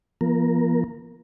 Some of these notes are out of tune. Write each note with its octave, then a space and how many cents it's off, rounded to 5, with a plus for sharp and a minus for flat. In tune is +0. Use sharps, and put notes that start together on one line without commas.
F3 -40 B3 -45 A#4 +0